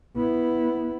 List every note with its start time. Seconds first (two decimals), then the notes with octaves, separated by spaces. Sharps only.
0.16 B3 E4